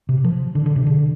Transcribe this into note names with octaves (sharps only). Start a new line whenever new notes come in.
C3
F3
D3
D3
C3
D3